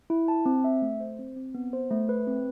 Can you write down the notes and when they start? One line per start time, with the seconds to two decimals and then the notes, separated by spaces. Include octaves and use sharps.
0.10 E4
0.28 A5
0.46 C4
0.64 E5
0.82 A3
1.00 C5
1.19 C4
1.36 C4
1.54 B3
1.73 C5
1.91 A3
2.09 B4
2.27 C4